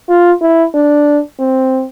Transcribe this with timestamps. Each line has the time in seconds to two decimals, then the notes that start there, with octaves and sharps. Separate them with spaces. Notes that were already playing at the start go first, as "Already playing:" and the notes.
0.09 F4
0.42 E4
0.74 D4
1.39 C4